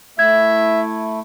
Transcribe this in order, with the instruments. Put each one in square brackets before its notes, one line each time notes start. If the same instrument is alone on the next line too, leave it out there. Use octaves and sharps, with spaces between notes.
[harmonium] A3 E4 [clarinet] E5 [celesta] G#6